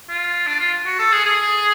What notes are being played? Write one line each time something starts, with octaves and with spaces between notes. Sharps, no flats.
F4
D4
F4
F#4
A4
G#4
G#4